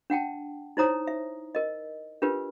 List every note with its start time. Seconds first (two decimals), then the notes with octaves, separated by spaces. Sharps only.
0.10 D4 F#5 G5 A5
0.77 D#4 E4 C5 C#5 A#5 D#6
1.07 E5
1.55 A#4 D#5
2.22 D4 F4 G4 A#4 B4